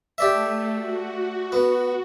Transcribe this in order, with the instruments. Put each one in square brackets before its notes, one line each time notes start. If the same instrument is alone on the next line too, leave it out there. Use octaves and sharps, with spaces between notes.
[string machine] A3 [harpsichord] G4 D5 E5
[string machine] F#4
[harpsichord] B3